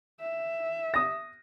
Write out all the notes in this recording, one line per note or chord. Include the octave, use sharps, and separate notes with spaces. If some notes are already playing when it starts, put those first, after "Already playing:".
E5
D#6 A#6